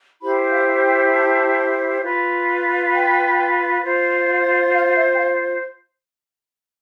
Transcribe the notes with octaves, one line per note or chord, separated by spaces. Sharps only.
E4 G4 C5 B5
F5
G5
A5
F4 B4
G5
F4 C5
F5
E5
G5
F5